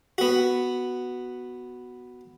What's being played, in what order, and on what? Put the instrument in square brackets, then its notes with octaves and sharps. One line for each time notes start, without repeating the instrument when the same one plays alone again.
[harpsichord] B3 F#4